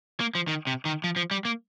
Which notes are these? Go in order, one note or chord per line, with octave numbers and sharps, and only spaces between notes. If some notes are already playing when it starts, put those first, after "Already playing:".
A#3
F3
D#3
C3
D#3
F3
F3
G3
A#3